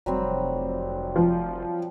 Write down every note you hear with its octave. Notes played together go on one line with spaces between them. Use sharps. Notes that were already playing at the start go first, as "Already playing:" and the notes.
F1 F#3 G3 C4
F3